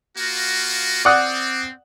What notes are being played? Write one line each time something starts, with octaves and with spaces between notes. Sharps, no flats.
A#3 F4 F#4
C4 D5 F#5 D#6